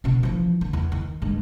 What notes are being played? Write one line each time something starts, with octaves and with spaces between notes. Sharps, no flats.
B2 C#4
E3 F3
D3
E2
D#3
G2 G#3